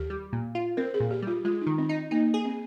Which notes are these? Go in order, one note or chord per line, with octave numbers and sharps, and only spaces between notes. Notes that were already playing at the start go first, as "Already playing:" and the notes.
Already playing: D#2 G4
G3
A#2
F4
C4 A#4
G#4
A#2
G4
G3 F4
G#3 F4
D#4
D#3
C4
D#4
A#3 D#4
G#4
C4